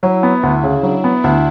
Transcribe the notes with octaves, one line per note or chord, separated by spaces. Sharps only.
F#3 E4
B3
D2
C#3
F#3 D4
B3
D2 E4